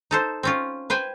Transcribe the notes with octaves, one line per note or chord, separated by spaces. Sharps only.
D#4 A4 C5
C4 C#4 F4
B4 C5 G5 G#5